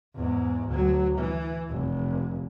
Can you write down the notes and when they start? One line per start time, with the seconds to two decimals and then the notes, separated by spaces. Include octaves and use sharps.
0.15 E2 G#2
0.68 D2 F#3
1.18 E3
1.70 F1